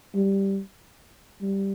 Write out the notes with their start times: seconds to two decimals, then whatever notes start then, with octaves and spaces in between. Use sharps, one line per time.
0.15 G3
1.42 G3